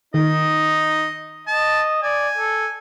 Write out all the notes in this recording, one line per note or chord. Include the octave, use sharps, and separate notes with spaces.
D#3 D#4 D#5
D#5 A5
D5 G#5
A4